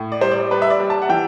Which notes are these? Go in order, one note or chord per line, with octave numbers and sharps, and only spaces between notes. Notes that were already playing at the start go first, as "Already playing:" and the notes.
Already playing: A2
D5
G3 C5
D5
G3 B4
E5
D5
G3
A5
F#5
E3 G5